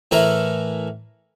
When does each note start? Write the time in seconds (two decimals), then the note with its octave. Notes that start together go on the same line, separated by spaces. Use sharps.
0.11 A2 E3 E4 A#4